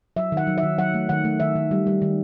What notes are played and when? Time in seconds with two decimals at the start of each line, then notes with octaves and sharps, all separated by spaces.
0.16 F#3 E5
0.32 D#3 F#5
0.47 F#3
0.58 E5
0.63 D#3
0.78 F#3 F#5
0.94 A3
1.09 D#3 F#5
1.25 A3
1.40 D#3 E5
1.56 D#3
1.71 G3
1.87 G3
2.02 D#3